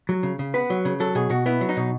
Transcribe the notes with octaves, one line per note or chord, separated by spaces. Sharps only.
F#3
C#3
C#3
B3 B4
F#3
C#3
F#3 A4
B2 G#4
B2 F#4
B3 E4
F#3
D#4
B2